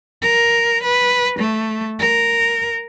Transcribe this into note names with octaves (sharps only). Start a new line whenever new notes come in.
A#4
B4
A3
A#4